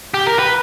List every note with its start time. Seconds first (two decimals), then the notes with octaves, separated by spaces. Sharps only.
0.14 G4
0.27 A#4
0.39 B4